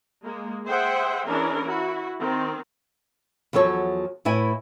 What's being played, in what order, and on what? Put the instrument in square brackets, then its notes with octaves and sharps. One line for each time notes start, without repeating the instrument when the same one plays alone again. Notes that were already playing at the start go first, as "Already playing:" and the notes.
[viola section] G#3 A#3
G#4 C5 E5 F#5 G5
E3 C#4 D4 G#4 A#4
E4 F#4
D#3 C4
[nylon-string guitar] E2 F3 F#3 A4 C#5
A2 E4 B4 G#5